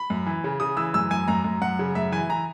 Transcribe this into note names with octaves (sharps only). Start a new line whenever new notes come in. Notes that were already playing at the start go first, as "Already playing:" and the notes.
Already playing: B5
F#2
E3
C#3
C#3 D#6
E3 E6
F#2 E6
F#2 G#5
F#2 A#5
F#2
F#2 F#5
C#3
F#2 E5
E3 G#5
E3 A#5